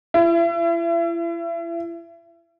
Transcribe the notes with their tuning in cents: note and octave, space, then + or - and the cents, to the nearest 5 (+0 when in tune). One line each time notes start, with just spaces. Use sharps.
E4 +35